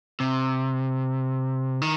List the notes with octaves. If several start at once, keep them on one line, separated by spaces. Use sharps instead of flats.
C3
D#3